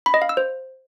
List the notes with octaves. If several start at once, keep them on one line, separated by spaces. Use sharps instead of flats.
B5
D#5
F5
E6
C5